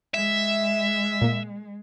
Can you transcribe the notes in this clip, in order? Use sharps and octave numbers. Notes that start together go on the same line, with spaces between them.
G#3 E5
A#2 A#3